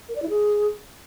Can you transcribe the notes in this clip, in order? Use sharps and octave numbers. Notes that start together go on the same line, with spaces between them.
A#4
D5
E4
G#4